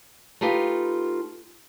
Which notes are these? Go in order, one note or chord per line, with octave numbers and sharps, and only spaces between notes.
A3 D#4 F4 G4 B4